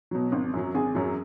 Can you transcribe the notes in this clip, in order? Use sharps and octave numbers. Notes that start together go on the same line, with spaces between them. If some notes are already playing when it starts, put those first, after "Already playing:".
B2 F#3
G#1
F#2 F#3
G#1 G#4
F#2 F#3